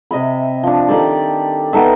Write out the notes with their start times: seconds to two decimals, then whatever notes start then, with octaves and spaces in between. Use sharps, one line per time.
0.11 C3 D#5 E5 B5
0.63 F3 D4
0.88 D#3 G4 A4 D5
1.73 B3 D#4 A4 E5